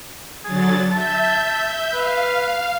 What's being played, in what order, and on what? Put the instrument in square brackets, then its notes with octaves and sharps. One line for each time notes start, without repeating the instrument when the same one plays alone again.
[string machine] D3 F#3 A6 [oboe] G#4
[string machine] E5 G6 [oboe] A5
[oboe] B4 [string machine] F5